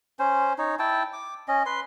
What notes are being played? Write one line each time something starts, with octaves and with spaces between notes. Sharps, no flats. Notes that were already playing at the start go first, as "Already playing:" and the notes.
C#4 C5
D#4 C#5
E4 G5 A5
D6
C#4 D#5
B4 C6